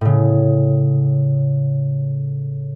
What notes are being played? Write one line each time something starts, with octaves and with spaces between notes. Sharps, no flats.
A2 C#3